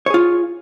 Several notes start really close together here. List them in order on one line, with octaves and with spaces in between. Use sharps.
C#5 G#4 F4